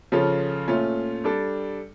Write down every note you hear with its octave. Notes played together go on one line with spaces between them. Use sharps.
C#3 F3 C#4 F4 A4
A#2 A3 C#4 F4
G3 D4 A4